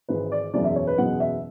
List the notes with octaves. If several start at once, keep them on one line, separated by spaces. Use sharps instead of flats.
G#1 G#2 E3 G#3 B4
D5
F#1 E2 B2 G#3 D5
E5
C#5
B4
F#1 E2 B2 G#3 F#5
E5